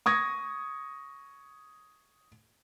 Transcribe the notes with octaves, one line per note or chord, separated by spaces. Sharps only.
C#6 D#6 G#6 A#6